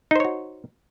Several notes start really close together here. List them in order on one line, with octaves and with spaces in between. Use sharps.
D#4 C5 C#5 F#4